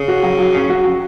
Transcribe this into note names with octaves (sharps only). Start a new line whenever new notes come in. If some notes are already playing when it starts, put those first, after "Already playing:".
Already playing: C#3
F#4
F#3
F#3
C#4
F#4
F#3